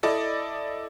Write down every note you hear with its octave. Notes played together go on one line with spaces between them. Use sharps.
E4 A4 D5 D#5